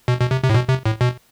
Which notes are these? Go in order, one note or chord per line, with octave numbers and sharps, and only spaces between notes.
B2
B2
C3
C3
A2
B2
C3
A2
B2